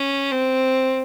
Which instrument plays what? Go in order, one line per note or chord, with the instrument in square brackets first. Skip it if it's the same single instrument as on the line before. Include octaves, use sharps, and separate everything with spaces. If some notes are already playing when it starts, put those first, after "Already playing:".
Already playing: [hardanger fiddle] C#4
C4